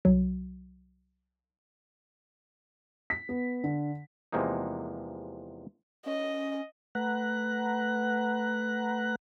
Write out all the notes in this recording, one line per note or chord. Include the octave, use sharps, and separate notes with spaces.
C2 F#3
B6
B3
D3
E2 C3 F3 G#3 A#3 D#4
C#4 D#5
A3 B4 F#5 A#5 F#6